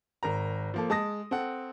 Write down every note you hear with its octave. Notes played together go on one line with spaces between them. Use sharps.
G#1 A#4 A#5
F3 A#3 A4
G#3 A5 D#6 A#6
C4 A4 F#5